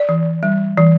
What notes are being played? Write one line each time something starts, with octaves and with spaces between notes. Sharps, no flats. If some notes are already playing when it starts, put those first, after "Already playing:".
Already playing: D5
E3
G3
E3